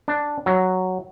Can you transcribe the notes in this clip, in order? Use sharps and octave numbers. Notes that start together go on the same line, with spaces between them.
D4
F#3